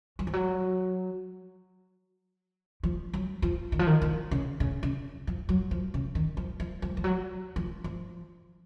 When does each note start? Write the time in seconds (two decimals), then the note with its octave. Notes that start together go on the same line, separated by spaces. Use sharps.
0.19 F#3
0.27 F3
0.33 F#3
2.83 F3
3.14 F#3
3.42 F3
3.72 D#3
3.79 F3
3.87 D#3
4.02 D#3
4.31 C#3
4.60 C#3
4.83 C#3
5.27 F3
5.49 F#3
5.71 F3
5.94 C#3
6.15 D#3
6.37 F3
6.60 F3
6.82 F3
6.97 F3
7.04 F#3
7.56 F3
7.84 F3